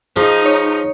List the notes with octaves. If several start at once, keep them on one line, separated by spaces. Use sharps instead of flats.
F3 D#4 G#4
C#5